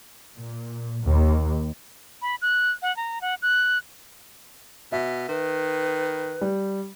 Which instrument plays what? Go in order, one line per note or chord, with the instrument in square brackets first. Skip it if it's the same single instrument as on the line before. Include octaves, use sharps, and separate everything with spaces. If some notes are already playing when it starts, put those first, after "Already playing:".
[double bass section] A#2
D#2
[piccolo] B5
F#6
F#5
A#5
F#5
F#6
[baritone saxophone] B2 [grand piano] E5
[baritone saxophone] D#3 [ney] B4
[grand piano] G3